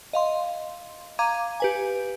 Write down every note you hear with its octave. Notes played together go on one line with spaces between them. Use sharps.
D#5 F5 C6
F5 A#5 D6 G#6 D#7
G4 B4 G#5